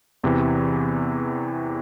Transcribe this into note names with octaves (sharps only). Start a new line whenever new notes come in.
E2 C3 E3